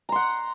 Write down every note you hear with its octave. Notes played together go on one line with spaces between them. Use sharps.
F#5 A#5 C6